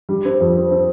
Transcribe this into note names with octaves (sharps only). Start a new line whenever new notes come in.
G3
C4
F2
C4
C4